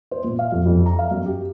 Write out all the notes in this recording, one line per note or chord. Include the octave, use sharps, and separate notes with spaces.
C5
A#2
F5
F2
F2
A#5
F5
F#2
G4